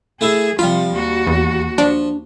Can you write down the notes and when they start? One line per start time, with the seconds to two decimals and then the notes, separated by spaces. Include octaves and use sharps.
0.21 A3 E4 G#4 E5
0.59 C3 F3 G3 F4 F5 B5
0.93 D#2 F#4
1.27 E2
1.78 F3 D4